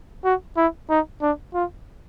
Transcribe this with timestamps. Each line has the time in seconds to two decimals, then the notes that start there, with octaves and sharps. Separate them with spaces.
0.25 F#4
0.57 E4
0.90 D#4
1.22 D4
1.54 F4